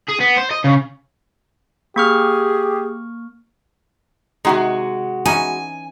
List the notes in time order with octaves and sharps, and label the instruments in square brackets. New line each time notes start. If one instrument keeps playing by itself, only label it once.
[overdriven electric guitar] G#4
B3
C5
D#5
C#3
[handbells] A#3 C#6 F6 [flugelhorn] G4 [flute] G#4
[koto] C3 D#3 D#4 [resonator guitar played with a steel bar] G#3 F#4
[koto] E3 C#4 D#4 [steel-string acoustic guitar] G#5